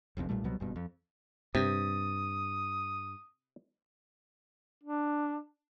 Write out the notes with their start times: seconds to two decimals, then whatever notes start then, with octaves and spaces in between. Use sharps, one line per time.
0.17 E1 B1 F2 C3
0.29 B1 A#2 G3 A3
0.44 C2 B2 F#3 G3
0.60 F#1 G2 B2
0.76 F2
1.55 G2 C3 D#6
4.83 D4